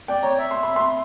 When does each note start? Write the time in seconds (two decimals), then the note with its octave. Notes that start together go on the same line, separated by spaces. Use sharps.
0.08 D5 G5
0.23 C#5 A#5
0.39 E5
0.51 C6
0.63 B5
0.76 C6